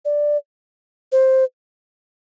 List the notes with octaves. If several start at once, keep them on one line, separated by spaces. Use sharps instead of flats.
D5
C5